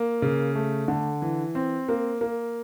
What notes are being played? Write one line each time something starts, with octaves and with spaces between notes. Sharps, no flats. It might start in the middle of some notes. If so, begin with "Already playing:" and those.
Already playing: A#3
C#3
A3
D3
E3
C4
A#3
A#3